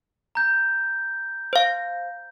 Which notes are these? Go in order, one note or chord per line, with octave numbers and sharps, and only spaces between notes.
A#5 G6
C5 F5